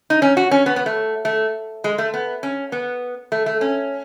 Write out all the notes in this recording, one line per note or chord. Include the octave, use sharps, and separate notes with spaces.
D#4
C#4
F#4
C#4
B3
B3
A3
A3
G#3
A3
B3
C#4
B3
A3
A3
C#4